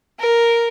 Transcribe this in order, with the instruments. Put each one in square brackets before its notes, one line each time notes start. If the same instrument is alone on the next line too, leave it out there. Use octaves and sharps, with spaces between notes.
[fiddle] A#4